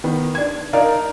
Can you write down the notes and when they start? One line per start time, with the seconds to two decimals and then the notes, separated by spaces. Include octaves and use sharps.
0.04 D#3 B3
0.35 D4 G#6
0.73 D4 D#4 A#4 D5 F5